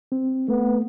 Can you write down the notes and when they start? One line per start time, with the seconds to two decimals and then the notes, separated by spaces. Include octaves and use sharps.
0.12 C4
0.48 A3 B3